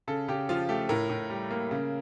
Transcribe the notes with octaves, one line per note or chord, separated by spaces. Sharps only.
C#3 A4
C#3 G4
F3 F4
A3 G4
A2 A#4
A2
G3
A#3
C#3